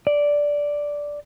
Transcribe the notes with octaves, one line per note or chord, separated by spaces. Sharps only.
D5